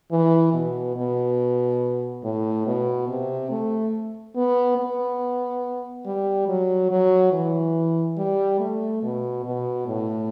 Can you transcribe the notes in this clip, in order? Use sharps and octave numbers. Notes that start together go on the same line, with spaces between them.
E3
B2
B2
A2
B2
C3
A3
B3
B3
G3
F#3
F#3
E3
G3
A3
B2
B2
A2